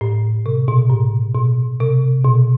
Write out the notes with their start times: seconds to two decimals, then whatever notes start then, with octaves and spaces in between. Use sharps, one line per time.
0.01 A2
0.46 C3
0.68 B2
0.90 A2
1.35 B2
1.80 C3
2.24 B2